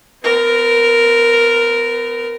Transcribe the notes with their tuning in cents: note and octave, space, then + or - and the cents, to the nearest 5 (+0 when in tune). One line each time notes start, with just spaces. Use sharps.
B3 +40 A#4 +0